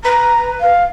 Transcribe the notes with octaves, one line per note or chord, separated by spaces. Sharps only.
B4 A#5
F5